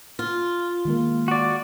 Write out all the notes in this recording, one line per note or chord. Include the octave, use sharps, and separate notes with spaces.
F4
D#3 G#3 A#3
F#4 D5